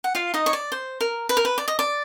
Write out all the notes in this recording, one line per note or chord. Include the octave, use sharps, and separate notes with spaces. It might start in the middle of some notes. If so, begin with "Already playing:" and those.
F#5
F4 F5
D#4 D#5
C#5
D5
C5
A#4
B4
A#4
B4
D5
D#5
D5